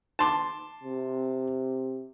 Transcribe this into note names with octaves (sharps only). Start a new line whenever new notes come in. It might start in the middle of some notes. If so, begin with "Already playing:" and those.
A5 C6 D6
C3